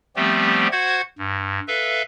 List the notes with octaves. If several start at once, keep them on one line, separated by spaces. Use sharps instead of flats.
F3 G3 A3 B3 C4 G4
F#4 C5 F#5 G#6
G2
A4 B4 E5 F5